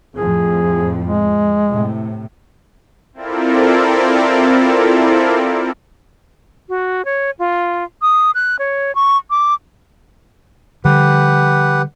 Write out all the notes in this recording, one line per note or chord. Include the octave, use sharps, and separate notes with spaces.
F2 A2 F3 G#4
G#3
A2 C3
C4 E4 F4 A4 A#4 D5
F#4
C#5
F4
D#6
F#6
C#5
C#6
D6
D3 F3 G3 G4 B4 F#5